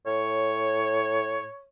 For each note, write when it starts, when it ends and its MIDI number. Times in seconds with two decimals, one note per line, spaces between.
0.06 1.47 45
0.06 1.65 73